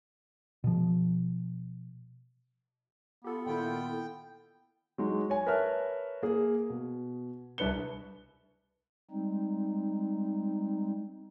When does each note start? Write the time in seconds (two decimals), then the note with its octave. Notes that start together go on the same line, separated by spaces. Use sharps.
0.64 B2 F3
3.24 B3 F4 G4 A4
3.46 A#2 D#3 E4 F4 A4 G5 B5
4.98 F#3 G#3 D#4
5.30 C#5 G#5
5.46 A#4 B4 C#5 E5 A5 F6
6.22 A#3 G#4
6.70 B2
7.58 C2 D4 B4 C#7 G7
9.11 G3 G#3 C4 D#4